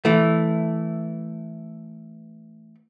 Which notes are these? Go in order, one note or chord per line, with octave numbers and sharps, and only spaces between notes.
E3 A3